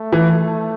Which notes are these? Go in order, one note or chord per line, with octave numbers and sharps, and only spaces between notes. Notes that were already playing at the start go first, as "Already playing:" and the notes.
Already playing: A3
E3